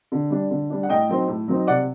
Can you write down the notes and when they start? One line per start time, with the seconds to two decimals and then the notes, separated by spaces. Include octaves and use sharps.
0.12 D3
0.30 G3 D4
0.50 D3
0.70 G3 D4
0.83 F#5
0.89 A2 D#5 G5
1.09 F#3 C4 D#4
1.28 A2
1.48 F#3 C4 D#4
1.67 C3 D5 F#5